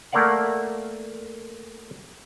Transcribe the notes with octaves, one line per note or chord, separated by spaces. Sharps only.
A3 A#3 A#4 D5 F5 F#5